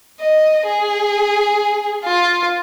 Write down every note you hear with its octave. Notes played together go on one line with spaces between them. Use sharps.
D#5
G#4
F4